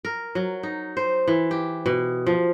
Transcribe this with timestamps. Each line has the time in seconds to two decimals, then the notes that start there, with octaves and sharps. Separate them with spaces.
0.05 A#4
0.35 F#3
0.63 D#4
0.97 C5
1.28 E3
1.51 G4
1.86 B2
2.27 F3